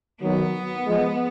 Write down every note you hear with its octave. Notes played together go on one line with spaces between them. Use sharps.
D#3 F#3 B3
F3 G#3